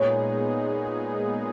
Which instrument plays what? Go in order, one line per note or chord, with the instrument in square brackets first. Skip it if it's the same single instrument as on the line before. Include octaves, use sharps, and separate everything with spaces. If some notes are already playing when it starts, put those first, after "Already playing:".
Already playing: [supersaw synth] A#2 G#3 B3 D#4 G#4 [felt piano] C#5